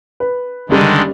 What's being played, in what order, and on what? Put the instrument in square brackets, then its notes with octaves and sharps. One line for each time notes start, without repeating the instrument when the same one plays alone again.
[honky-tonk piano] B4
[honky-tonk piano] F#1 G3 [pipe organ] D3 D#3 G#3